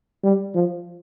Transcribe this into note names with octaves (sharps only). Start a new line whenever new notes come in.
G3
F3